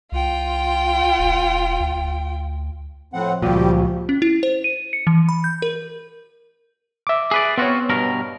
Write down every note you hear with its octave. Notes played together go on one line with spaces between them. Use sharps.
C2 F4 G5
E1
D2
A2 F3 C4 F#5
C#2 A#2 F3 G3 F#4 G4
C#4
E4
C5
D#7
C#7
E3
B5
G6
A#4
E5 D6
G#4 B4 D5
B3 C4 F4 F#4 C#5
G2 B2 A#4